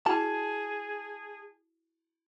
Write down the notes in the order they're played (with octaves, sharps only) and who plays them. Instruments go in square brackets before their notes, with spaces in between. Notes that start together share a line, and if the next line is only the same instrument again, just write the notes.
[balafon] E4 F#4 G5 [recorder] G#4 [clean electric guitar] A5